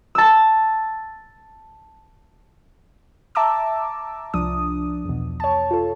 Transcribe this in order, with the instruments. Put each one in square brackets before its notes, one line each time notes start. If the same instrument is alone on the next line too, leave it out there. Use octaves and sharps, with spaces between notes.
[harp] A5 E6
[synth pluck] E5 A5 A#5 D6 E6
C2 F3 D4 D#6
E2 B2
C#5 A5
F4 A4